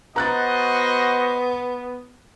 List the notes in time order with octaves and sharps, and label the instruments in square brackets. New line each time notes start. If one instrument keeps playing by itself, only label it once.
[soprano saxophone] B3 [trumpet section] F#4 C5 D#5 [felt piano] A#5 F#6 A6